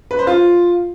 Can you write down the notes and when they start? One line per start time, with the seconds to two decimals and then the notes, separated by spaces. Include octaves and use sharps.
0.11 B4
0.19 C5
0.27 F4